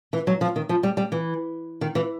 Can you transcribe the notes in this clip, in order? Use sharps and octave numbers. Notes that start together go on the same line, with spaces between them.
E3
F#3
F3
D#3
F3
G3
G3
E3
D#3
E3